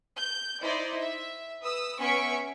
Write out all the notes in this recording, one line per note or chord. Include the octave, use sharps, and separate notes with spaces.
G6
D#4 E4 C5 D5
E5
B4 D#6 E6
B3 C#4 E5 C#6 B6 D7